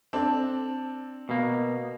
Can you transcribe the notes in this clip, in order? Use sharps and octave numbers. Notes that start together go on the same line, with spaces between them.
C4 D4 A4
B2 A#3